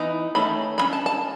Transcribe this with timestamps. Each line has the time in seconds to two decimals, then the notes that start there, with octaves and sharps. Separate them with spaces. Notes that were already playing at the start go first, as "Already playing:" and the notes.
Already playing: E3 B3 D#4
0.35 D#3 A3 C#4 B5
0.78 F#3 B5
0.81 C#4
0.93 A5
1.06 A5